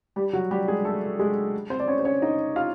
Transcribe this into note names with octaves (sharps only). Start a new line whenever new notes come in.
G3 G4
F#3 F#4
G3 G4
G#3 G#4
A3 A4
G#3 G#4
C4 C5
D5
C#4 C#5
C5
C#4 C#5
D#4 D#5
F4 F5